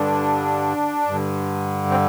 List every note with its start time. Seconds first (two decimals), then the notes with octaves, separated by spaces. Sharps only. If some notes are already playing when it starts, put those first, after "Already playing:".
Already playing: G2 D3 D4
1.08 G2 D3
1.91 C4